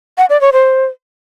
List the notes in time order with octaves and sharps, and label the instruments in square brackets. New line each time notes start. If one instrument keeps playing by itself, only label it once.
[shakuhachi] F#5
D5
C#5
C5